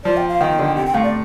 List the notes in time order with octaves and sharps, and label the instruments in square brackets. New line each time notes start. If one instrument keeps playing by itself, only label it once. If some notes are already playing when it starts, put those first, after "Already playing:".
[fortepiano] F3 [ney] D5
[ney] G5
F5
[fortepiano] D#3 [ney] G5
[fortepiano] D3
[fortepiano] C3 [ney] G5
[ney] G5
[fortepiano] A2 [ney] F5
[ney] D5